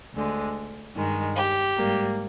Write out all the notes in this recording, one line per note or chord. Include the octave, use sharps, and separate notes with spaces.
D2 D3 G#3
G2 D#3 G#3
G4
G#2 G3 A#3